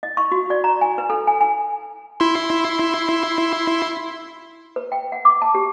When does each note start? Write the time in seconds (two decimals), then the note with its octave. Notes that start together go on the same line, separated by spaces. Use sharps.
0.03 D#5
0.17 C#6
0.32 F#4
0.50 D5
0.64 A#5
0.81 G#5
0.98 B4
1.10 A4
1.27 G#5
1.41 G#5
2.20 E4 C6
4.76 B4
4.92 G5
5.12 F#5
5.25 D6
5.42 A5
5.55 G4